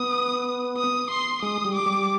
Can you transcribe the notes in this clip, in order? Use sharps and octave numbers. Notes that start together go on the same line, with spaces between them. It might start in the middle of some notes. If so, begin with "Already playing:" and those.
Already playing: B3 D#6
D#6
C6
G#3 D#6
G3
D6
G3